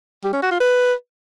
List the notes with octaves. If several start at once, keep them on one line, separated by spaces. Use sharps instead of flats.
G3
C#4
F#4
F4
B4